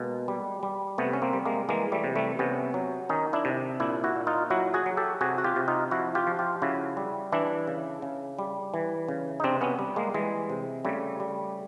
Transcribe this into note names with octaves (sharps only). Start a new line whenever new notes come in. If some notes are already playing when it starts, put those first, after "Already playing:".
Already playing: B2 G#3 A#3
G3
G3
C3 A3 B3
C#4
A#3 C4
G3
G#3 A#3
E3 G#3 A#3
G3 A3
C3
G3 A3
C3 B3 C#4
F#3
D#3 C#4 D#4
D4 E4
C3
A#2 D4 E4
E4 F#4
A#2
D#4 F4
F#3 E4 F#4
F#4 G#4
F#3
G4 A4
C3 F#4 G#4
F#4
F4 G4
C3
D#4 F4
F3 E4 F#4
F4 G4
F3
F4 G4
C#3 E4 F#4
G3
E3 D4 E4
C#3
C#3
G3
E3
C#3
D#4
C3 C4 D4
B3 C#4
G3
G#3 A#3
E3 G#3
C3
C#3 G3 A3
G3